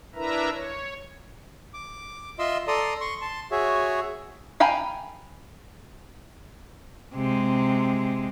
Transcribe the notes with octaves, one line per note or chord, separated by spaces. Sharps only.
D4 E4 A#4 B4 E5 A#5
C#5
D6
F4 D#5 E5 C6 E6
A4 D5 A#5 C6 D#6
C6 C#6
A5 C6
F#4 G#4 C#5 E5
F5 G5 G#5 A#5 B5
C3 G#3